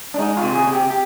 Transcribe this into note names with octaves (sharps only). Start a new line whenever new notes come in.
D4
G#3 D#4
F4
C3
G#4
C3
G4
G4